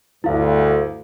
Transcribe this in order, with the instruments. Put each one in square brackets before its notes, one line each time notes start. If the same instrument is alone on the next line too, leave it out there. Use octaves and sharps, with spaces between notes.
[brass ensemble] D2 G2 [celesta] E4 F5